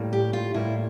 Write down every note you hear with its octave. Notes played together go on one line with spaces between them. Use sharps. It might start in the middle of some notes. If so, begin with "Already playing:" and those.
Already playing: A2 G3 A#3
G4
F4
A2 G3 A#3 E4